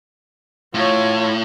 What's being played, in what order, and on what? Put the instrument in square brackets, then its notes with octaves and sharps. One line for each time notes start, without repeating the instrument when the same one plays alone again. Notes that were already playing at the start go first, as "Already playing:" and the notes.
[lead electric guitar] A2 [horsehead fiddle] F4 C#5